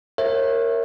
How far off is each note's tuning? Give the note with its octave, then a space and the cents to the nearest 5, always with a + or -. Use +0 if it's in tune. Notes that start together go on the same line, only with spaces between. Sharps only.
A#4 -10 C#5 -35 E5 +0